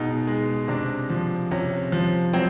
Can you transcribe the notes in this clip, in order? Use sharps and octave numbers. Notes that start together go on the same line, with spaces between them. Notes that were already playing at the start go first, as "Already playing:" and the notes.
Already playing: B2 G#3 D#4
G#3
C3 D4
F3
C3 C#4
F3
F#3 C4